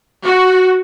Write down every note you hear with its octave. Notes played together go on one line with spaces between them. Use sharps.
F#4